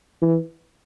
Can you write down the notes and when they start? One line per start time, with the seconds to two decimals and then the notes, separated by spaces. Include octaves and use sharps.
0.22 E3